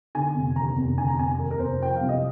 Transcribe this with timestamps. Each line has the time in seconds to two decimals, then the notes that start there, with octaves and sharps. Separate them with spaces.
0.15 D3 G#5
0.35 F1
0.56 D#2 A#5
0.76 F1
0.98 D3 G#5
1.08 A#5
1.18 F1 G#5
1.38 D#2 A#4
1.51 A#4
1.59 F1 C5
1.80 F3 G5
1.96 C2 F5
2.09 D#5